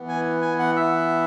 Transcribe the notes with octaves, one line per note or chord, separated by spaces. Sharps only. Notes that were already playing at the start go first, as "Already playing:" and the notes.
Already playing: E3 B3
G#5
G#5
F#5
E5